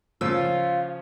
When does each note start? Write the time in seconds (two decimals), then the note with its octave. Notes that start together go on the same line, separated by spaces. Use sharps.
0.21 C#3 F3 F4 E6